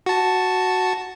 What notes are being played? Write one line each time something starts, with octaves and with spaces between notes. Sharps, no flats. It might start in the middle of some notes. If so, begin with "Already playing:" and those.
F#4 A5